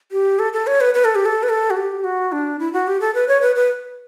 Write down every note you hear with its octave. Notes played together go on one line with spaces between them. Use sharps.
G4
A4
A4
C#5
B4
B4
A4
G4
A4
B4
A4
F#4
G4
F#4
D4
E4
F#4
G4
A4
B4
C#5
B4
B4